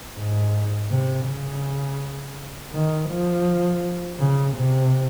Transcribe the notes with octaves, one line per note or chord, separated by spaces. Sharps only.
G#2
C3
C#3
D#3
F3
C#3
C3